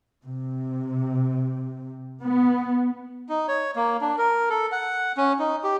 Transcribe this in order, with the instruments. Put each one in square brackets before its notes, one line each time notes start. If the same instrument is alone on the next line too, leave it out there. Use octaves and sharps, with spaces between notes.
[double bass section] C3
B3
[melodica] D#4
C#5
A#3
D4
A#4
A4
F#5
C#4
D#4
G4